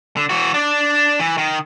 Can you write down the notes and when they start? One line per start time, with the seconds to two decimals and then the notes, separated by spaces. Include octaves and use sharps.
0.17 D3
0.29 E3 F#4
0.54 D4 D5
1.20 E3
1.38 D#3